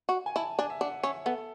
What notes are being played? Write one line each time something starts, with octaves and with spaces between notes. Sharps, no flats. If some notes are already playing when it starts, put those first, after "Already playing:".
F#4
G#5
E4 A5
D4 G#5
E5
D4 F#5
C#4 E5
B3 A4